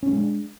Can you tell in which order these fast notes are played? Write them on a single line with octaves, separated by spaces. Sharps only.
C#4 A3 G#3 D4